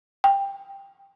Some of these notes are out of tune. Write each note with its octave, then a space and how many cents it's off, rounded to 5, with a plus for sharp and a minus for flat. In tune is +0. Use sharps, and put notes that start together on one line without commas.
G5 +15